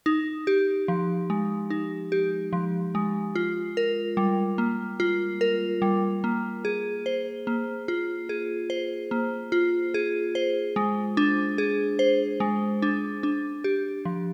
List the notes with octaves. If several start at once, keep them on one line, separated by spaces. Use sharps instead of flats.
D#4
G4
F3
G#3
D#4
G4
F3
G#3
F4
A#4
G3
A#3
F4
A#4
G3
A#3
G#4
C5
A#3
F4
G#4
C5
A#3
F4
G#4
C5
G#3
D4
G#4
C5
G#3
D4
D4
G4
F3